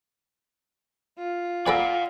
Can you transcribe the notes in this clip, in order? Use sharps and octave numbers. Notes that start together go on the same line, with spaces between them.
F4
A4 B4 D5 F5 F#5 G#5 A#6 D7